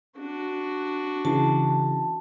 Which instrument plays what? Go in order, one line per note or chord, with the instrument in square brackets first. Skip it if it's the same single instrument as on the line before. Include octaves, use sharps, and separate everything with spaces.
[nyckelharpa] D4 F#4
[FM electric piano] C#3 E3 [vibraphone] A5